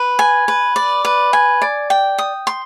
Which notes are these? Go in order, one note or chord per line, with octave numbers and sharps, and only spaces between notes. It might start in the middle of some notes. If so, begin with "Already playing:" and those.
Already playing: B4
G#5
B4
D5
B4
G#5
D5
G5
D#6
C6